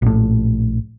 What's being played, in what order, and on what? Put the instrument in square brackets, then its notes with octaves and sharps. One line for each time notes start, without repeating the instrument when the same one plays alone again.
[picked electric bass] A#1 A2